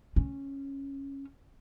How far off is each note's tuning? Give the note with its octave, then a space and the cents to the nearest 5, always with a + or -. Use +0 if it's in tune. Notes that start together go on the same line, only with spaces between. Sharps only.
C#4 -10